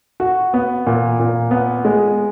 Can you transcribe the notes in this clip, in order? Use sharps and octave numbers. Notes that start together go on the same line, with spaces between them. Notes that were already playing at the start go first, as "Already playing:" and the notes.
F#4
B3
A#2
A#2
B3
G#3